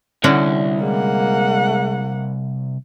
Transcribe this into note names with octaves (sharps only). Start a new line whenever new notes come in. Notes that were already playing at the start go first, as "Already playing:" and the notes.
C2 D3 C#4 E4 F#4
G#3 A#3 F#5